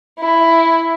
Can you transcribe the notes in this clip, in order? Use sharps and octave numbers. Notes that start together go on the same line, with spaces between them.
E4